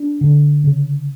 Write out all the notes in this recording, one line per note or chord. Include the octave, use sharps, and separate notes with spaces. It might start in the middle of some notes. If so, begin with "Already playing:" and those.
Already playing: D4
D3
C#3